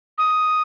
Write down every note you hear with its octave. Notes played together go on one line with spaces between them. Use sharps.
D#6